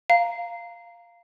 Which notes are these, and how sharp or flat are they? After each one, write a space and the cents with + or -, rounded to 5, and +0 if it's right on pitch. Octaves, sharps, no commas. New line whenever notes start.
F5 -5 A#5 +0